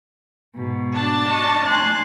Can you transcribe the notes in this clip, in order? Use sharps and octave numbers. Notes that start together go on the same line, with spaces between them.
G#2 B2
D4 A5
D#5 C#6
G#5 C6 F#6